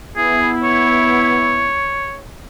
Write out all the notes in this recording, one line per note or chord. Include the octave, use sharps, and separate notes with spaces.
B3 E4 G#4
C#5